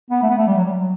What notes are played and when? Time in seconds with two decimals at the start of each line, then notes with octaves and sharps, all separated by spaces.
0.10 B3
0.23 A3
0.29 B3
0.38 A3
0.47 G3
0.56 F#3
0.65 G3
0.73 F#3